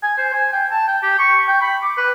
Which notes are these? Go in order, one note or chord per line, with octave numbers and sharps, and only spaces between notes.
G#5
C5
G#5
G5
A5
G5
G4
C#6
G5
B5
D6
B4